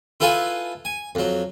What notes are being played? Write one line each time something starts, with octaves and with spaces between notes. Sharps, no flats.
E4 F4 A4 B4 G#5
G#5
F2 F#3